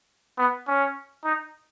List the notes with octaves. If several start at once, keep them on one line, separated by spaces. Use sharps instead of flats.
B3
C#4
D#4